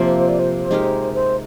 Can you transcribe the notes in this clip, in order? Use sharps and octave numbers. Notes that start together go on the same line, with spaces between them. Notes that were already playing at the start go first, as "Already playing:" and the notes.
Already playing: C3 F3 A#3 C5
D5
C5
C5
G#3 D#4 G4 A#4
C5